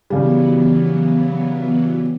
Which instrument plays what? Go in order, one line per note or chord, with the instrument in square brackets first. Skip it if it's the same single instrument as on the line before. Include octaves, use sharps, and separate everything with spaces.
[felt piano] C#3 G3 [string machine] E3 F#3 B3